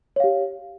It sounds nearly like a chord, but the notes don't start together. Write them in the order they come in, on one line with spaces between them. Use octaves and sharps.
C#5 F5 G4